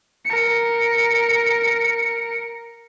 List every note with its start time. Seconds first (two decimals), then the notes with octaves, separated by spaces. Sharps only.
0.25 A#4 C#7